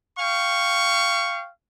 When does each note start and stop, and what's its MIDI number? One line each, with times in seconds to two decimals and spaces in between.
0.18 1.47 77
0.18 1.47 79
0.18 1.47 85